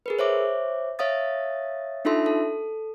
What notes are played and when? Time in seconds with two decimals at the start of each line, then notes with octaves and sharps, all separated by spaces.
0.06 G#4 A#4 B4
0.19 C5 C#5 E5 D6
0.99 C#5 E5 F5 D#6 A6
2.05 D4 D#4 F4 A4 E5 C6
2.26 A4